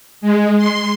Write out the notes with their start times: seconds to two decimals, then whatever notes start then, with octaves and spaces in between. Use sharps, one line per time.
0.21 G#3
0.58 C6